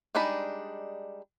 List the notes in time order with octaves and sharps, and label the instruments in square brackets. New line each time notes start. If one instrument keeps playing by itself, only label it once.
[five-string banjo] G3 G#3 D4 D#4 B5